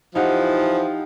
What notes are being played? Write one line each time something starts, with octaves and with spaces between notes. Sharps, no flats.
E3 F3 D#4 G4 F#5